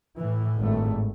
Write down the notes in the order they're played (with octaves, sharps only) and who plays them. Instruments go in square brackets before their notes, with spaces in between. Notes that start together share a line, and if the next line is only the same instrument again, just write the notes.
[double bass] A2 [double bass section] E3
[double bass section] G#1 G2 A3